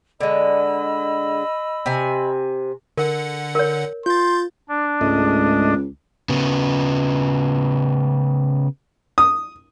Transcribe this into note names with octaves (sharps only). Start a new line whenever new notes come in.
D3 G#3 D#5 B5 E6
C3 G#5
D3 A#4 F#5
A#4 C#5
F4 C6 G6 A6
D4
C#2 G#2 A3 D#5
C#3 B3
D#6